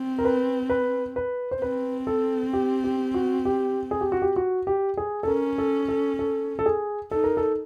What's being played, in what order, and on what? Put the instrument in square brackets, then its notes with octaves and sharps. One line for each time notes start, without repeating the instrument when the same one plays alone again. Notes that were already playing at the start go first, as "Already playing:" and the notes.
Already playing: [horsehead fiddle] C4
[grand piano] A#4
B4
B4
B4
C5
[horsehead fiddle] C4 [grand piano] B4
[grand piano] A4
G4
G4
F#4
G4
G#4
G4
F#4
G4
F#4
G4
G#4
A4
[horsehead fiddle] C#4 [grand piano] A#4
[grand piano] A4
A4
A4
A4
G#4
[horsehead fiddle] D#4 [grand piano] A4
[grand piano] A#4
A4